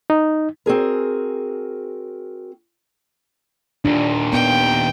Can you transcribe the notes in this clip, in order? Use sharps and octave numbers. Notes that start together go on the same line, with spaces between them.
D#4
C4 F#4 G#4 A#4
D#2 A#2 D4
B3 G5